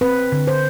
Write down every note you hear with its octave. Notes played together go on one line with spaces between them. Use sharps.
C4 B4
D3
C5